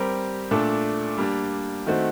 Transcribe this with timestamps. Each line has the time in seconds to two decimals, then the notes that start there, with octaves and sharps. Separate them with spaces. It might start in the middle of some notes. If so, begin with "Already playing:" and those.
Already playing: G3 C4 G4 A#4
0.51 A#2 A3 D4 A4
1.18 G3 A#3 D4
1.87 D#3 A3 C4 F#4